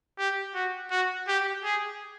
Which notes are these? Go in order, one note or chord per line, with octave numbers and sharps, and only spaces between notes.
G4
F#4
F#4
G4
G#4